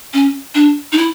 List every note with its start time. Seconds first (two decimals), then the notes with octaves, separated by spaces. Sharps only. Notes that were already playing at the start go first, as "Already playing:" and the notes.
0.14 C#4
0.55 D4
0.92 D#4
0.98 E4